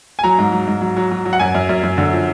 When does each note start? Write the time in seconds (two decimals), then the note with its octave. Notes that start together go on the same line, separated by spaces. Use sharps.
0.19 G#5
0.24 F#3 A#5
0.38 G#2
0.52 F#3
0.67 G#2
0.81 F#3
0.97 F#3
1.11 F#3
1.25 F#3
1.33 F#5
1.39 F#2 G#5
1.54 F#2
1.69 F#2
1.83 F#2
1.98 D3
2.13 F3